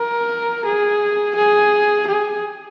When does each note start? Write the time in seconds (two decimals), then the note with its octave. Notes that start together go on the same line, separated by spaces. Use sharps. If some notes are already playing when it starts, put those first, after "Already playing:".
Already playing: A#4
0.65 G#4
1.35 G#4
2.07 G#4